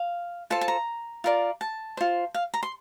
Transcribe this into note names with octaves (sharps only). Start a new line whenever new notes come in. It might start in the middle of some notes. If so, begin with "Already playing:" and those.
Already playing: F5
F4 A4 C5 A5
A5
A#5
F4 A#4 D5
A5
F4 C5
F5
A#5
C6